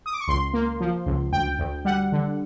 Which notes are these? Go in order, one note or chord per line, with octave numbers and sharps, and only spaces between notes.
D#6
D6
C#6
C#2 C6
A#3
F3
C#2
D2 G5
D2
G3 F#5
D3